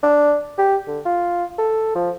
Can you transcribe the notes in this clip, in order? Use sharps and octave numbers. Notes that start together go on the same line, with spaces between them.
D4
G4
D3
F4
A4
F3